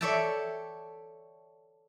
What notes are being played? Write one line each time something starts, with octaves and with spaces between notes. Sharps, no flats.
A4 C#5 D5 E5 G5 A5